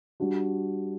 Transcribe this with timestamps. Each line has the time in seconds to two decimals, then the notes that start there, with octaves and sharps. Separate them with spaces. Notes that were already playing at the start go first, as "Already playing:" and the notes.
0.20 G3 D4 F#4